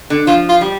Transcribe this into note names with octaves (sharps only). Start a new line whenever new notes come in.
D3
F3 F4
F4
G3